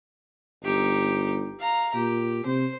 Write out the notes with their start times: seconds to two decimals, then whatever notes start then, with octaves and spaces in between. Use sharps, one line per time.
0.64 G1 D#4 G4
1.60 F5 A#5
1.94 A#2 G4
2.46 C3 C5